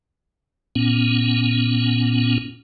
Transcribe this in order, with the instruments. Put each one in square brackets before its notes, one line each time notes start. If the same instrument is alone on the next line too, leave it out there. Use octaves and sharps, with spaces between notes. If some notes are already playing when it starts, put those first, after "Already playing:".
[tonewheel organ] A#2 B3 C#4